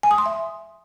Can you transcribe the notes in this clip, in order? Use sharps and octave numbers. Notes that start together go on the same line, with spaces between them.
G#5
D#6
C6
E5